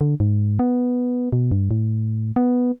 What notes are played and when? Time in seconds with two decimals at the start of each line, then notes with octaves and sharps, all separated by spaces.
0.01 D3
0.20 G#2
0.59 B3
1.33 B2
1.52 G2
1.71 A2
2.36 B3